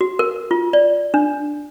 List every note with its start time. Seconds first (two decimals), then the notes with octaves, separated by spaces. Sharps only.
0.01 F#4
0.19 A#4
0.51 F4
0.73 D5
1.14 D4